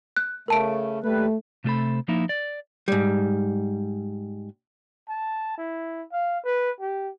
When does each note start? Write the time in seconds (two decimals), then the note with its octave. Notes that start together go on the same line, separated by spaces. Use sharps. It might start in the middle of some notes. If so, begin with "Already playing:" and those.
0.16 F#6
0.48 C#3 A3 A#4 A5 D7
1.04 D#2 G3 A3 B4
1.64 C3 A3 F4 A4 C5 B5
2.08 F3 A#3 D#4 E4
2.29 D5
2.88 G#2 G3
5.09 A5
5.58 E4
6.13 F5
6.45 B4
6.80 G4